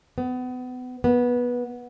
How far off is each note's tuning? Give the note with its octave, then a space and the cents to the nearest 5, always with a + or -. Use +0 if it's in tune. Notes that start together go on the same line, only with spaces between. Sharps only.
B3 +30
B3 -15